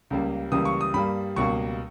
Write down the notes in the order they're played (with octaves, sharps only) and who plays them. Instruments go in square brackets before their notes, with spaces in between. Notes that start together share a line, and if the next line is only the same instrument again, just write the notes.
[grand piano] C#2 C#3 G3 A#3
C#2 C#3 E3 G3 A#3 D#6
C#6
D#6
G2 G3 A#3 B5
C#2 B2 G3 A#3 C#6